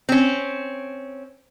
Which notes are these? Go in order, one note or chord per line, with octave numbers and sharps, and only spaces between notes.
C4 C#4